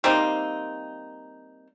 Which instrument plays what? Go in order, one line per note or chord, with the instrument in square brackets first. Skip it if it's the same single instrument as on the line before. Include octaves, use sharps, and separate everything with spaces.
[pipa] G3 A#3 C4 D#4